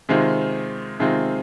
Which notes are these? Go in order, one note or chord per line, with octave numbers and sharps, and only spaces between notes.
C3 D#3 G#3 C4 F4
C3 D#3 G#3 C4 F4